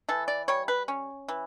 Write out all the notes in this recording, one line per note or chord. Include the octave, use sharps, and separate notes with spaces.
E3 A4
D5
G3 C#5
B4
C#4
E3